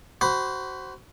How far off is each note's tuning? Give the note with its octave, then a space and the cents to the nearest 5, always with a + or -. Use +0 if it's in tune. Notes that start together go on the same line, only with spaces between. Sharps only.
F#4 +25 C5 +0 B5 +0